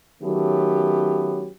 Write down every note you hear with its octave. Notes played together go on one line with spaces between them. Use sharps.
D#3 F#3 A3 B3 C#4 G4